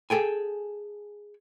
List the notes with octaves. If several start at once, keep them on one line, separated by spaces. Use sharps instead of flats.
G#4 A4 G5 G#5